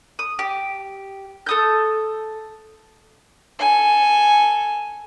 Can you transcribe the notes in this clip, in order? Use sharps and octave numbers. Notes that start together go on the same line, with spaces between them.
D#6
G4
A4 D#6 G6
A4 G#5